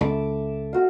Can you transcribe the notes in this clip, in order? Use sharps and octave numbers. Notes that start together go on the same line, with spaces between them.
C#2 A4 E5 D6
F#4 F5